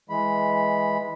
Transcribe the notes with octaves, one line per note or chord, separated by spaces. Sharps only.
E3 G#3 B5